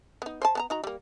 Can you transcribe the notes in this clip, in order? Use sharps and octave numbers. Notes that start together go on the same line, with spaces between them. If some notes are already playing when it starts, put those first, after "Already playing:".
B3 D#4
C5 G#5 A5
B3 A5 A#5
D#4 F#4 A#5
G3 A#3